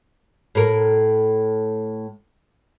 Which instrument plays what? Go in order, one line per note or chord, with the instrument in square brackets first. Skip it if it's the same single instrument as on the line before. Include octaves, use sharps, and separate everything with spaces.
[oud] A2 A#4